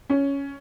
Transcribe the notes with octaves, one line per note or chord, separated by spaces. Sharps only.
C#4